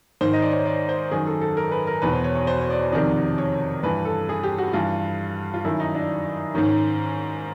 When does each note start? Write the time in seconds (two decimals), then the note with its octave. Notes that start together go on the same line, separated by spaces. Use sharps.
0.21 G#2 D#3 C5
0.33 D#5
0.42 D5
0.51 C#5
0.65 D5
0.89 C5
1.11 F#2 D#3 G#4
1.27 A4
1.41 A4
1.57 A#4
1.72 B4
1.87 A#4
2.02 E2 B2 B4
2.13 C5
2.24 C#5
2.35 C#5
2.47 C5
2.61 C#5
2.70 D5
2.92 F2 C3 D#3 D5
3.38 C#5
3.83 G2 E3 B4
4.05 A4
4.29 G#4
4.43 G4
4.58 F#4
4.73 G2 E3 F4
5.54 F4
5.65 F#2 D#3 E4
5.80 D#4
5.95 D4
6.55 G#2 D#3 C#4